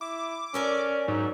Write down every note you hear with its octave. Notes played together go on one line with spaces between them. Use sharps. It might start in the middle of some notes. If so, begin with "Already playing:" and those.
E4 D6
C#4 A4 A#4 D5
G#2 F#3